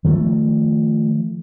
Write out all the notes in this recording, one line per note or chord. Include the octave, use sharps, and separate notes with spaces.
D#3 F3 G3 A3